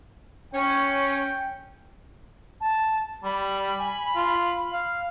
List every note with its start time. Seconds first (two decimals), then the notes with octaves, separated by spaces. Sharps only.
0.54 C#4 G5
2.61 A5
3.24 G3 B5
3.80 G#5
4.15 F4
4.73 F5